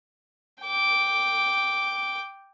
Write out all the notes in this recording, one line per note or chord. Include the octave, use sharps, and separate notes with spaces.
G5 D6